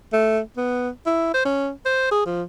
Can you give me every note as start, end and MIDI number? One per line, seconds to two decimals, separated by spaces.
0.13 0.40 57
0.57 0.90 59
1.06 1.31 64
1.34 1.44 72
1.45 1.71 61
1.86 2.11 72
2.12 2.24 68
2.26 2.43 53